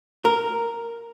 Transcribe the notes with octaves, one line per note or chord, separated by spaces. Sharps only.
A#4